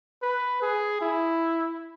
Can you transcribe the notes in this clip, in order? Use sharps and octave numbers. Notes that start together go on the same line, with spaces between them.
B4
G#4
E4